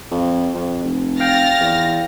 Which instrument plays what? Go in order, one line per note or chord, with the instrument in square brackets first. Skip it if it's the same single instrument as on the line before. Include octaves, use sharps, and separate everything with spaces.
[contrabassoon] F2
F2
F1
[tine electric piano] F5 G5 [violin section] F6 A6 A#6
[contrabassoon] E2